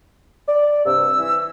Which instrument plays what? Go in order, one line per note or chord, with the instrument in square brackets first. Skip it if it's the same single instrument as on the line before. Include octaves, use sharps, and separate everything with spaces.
[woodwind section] D5
[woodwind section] G2 C3 [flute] E6
[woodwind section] E3